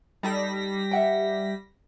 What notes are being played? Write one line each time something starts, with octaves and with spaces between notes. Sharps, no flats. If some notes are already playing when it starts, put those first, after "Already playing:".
G3 D#4 A4 B5 A#6 B6
E5 F#5 G5